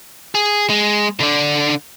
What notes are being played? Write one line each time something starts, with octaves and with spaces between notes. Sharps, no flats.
G#4
G#3
D3 D4